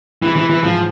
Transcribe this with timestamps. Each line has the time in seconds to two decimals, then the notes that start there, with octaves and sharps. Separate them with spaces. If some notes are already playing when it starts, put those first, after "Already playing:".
0.22 C3 E3 G#3 C4
0.36 E3
0.50 E3
0.63 G#2 E3 F3 G#3 C4 E4